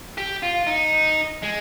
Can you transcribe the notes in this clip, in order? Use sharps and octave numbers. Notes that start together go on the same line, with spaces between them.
G4
F4
D#4
G#3